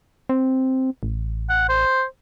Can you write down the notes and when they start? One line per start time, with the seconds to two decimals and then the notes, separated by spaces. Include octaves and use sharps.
0.29 C4
1.03 A1
1.50 F#5
1.69 C5